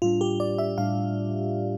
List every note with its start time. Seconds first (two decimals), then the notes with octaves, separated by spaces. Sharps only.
0.02 A2 G3 D4 F4
0.21 G4
0.40 D5
0.58 E5
0.78 A2 G3 D4 F5